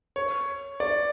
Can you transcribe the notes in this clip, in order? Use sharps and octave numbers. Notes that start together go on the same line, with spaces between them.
C#5
D5